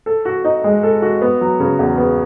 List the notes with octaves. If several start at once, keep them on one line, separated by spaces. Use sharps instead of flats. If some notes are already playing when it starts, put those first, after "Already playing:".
A4
F#4
D#4
G#3
A4
F#4
B3
F#3
C#3
E2
B3